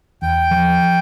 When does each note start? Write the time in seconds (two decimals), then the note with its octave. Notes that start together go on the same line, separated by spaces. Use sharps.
0.22 E2 G5
0.51 F3